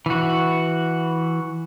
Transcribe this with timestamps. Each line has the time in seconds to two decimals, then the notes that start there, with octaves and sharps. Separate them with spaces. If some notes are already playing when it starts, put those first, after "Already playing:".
0.06 E3 F#4